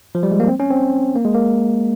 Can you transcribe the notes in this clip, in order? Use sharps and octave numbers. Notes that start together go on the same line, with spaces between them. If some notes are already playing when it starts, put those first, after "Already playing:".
F3
G3
G#3
A#3
C4
C#4
C4
A#3
G#3
A#3